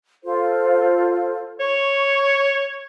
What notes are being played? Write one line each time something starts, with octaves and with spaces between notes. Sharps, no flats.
F4 A4 C5
C#5 C#6